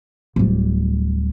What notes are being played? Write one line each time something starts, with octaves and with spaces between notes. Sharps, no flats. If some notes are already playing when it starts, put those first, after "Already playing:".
D1 G3